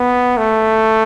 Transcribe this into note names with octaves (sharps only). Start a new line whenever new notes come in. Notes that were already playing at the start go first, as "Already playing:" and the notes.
Already playing: B3
A3